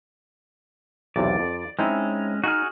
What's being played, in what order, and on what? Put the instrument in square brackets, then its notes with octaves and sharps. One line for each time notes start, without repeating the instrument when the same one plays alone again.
[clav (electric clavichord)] B1 E2 C3 [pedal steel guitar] D5
[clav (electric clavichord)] F2
[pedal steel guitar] G#3 C#4 [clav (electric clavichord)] C4 D#4 E4
[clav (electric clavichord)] D#4 [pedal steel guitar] F#4 G#4 F6